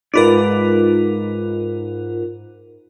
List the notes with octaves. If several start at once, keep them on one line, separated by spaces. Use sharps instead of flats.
G#2 D#4 F4 A#4 B4 D5